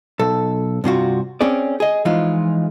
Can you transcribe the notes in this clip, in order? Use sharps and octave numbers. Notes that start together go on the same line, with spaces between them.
B1 A4
G2 C3 F4 F#4
C4 C#4 G#4 D5
G#4 D#5
E3 F3 G#3 D#4 F4